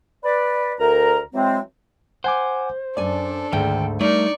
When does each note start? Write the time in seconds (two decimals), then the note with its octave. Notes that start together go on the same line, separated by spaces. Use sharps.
0.24 B4 D5
0.79 D2 A#4 A#5
1.33 E3 F#3 G#3 C4
2.24 C5 F#5 G#5 D6
2.97 F#2 D4 A4 D5 G#5
3.52 D2 G#2 D#3 G5
4.01 G3 A3 D#4 A#4 D5 C#6